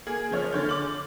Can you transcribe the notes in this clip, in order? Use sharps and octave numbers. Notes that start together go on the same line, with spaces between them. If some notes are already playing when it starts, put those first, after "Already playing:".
A#3 G#4
C#3 F3 C#5 F6
D3 C#5 G6
D6 F#7